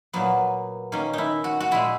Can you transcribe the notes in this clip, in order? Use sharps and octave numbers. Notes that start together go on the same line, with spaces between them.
A#2 F#3 A#3 B3
D#3 A#3 C#4
D#4 E4
F#4
F#4
A#2 G#3 E4